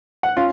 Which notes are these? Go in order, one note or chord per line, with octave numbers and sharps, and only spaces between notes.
F#5
C#4 F4